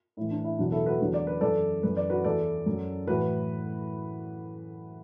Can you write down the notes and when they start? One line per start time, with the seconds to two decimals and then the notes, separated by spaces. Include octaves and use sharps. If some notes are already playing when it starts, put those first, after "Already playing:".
0.17 A2 E3 E4
0.31 D4
0.44 E4
0.58 E2 B2 F#3 D4 F#4
0.72 E4 A4
0.86 F#4 B4
1.00 E2 D3 F#3
1.14 D5
1.27 B4
1.41 F#2 E3 A4 D5
1.83 F#2 E3 B4
1.97 D5
2.10 F#4 B4
2.24 E2 E3 A4 D5
2.66 F#2 F#3
3.07 A2 E3 F#4 B4